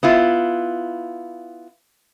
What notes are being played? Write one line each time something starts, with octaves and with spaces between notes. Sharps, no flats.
B3 E4 F4